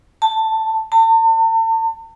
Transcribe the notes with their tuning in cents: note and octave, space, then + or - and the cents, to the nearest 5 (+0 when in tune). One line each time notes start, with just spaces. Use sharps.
A5 +10
A5 +40